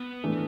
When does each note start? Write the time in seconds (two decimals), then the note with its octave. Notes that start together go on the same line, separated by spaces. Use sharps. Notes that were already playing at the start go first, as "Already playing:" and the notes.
Already playing: B3
0.24 A2 E3 A3 D4